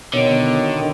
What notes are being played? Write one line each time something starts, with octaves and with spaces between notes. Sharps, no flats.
B2 D3 D#3 C#5 D7